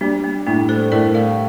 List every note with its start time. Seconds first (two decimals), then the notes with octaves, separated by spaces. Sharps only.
0.01 G3 A#3 D4
0.24 A#3
0.47 A2 A#3 D4
0.69 A4 C5
0.92 A2 A#4 D5
1.14 D5 F5